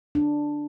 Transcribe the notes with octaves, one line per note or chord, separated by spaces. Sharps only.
D4